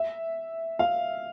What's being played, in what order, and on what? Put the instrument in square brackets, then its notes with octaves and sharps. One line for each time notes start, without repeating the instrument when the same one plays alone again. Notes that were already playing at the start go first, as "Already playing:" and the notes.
Already playing: [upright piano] E5
F5